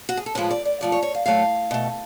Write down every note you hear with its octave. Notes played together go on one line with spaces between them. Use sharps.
F#4
G#4
A4
A2 F3 G#3 B4
D5
D5
F#2 F3 A3 D5
C#5
C#5
F5
A2 F#3 A3 F5
B2 A3